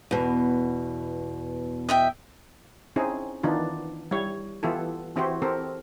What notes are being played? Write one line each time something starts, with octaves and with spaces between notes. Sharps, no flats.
E2 B2
D#5 E5 G5
C4 C#4 D#4 E4 G#4
D#3 E3 B3 D4 D#4 F4
G3 E4 C#5
E3 B3 E4 F4 G4 A4
E3 C4 E4 F#4 G4 C5
C4 E4 G4 A4 A#4